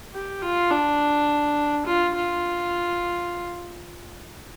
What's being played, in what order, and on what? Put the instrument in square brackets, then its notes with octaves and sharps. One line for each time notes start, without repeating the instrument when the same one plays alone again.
[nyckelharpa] G4
F4
D4
F4
F4